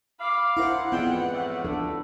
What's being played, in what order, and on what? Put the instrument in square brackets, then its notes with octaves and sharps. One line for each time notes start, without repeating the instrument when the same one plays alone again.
[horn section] F5 [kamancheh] B5 D6
[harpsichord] D4 A#4 [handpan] E4 C5 [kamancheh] F#5
[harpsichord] F2 G#2 E3 [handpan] B3 [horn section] D4 G5
[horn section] A2 D5
[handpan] F3 D4 A4